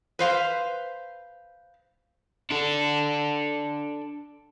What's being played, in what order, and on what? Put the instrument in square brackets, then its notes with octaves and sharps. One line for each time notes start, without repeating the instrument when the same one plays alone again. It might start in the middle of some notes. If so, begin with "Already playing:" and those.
[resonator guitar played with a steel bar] B4 C5 F5
[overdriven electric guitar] D4 A4